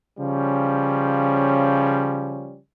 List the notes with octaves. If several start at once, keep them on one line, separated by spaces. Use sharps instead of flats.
C#3 F3 G3 C#4